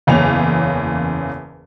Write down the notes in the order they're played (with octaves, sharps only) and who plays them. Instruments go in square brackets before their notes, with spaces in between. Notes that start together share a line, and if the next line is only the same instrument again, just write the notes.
[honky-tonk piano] F#1 E2 A#3 C#4 F7